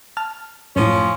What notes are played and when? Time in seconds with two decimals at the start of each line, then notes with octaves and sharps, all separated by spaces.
0.17 A5 F6
0.76 F#2 A2 F3 C#4